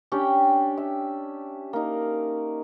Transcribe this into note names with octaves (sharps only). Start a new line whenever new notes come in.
C#4 D4 G4 G5
E5
A#3 D#4